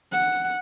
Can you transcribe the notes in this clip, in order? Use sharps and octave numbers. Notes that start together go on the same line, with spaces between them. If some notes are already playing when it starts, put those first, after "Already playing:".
F#5